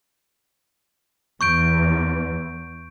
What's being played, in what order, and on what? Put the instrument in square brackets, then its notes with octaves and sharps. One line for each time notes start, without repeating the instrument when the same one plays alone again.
[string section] E2 [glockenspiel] C#6 G6 D7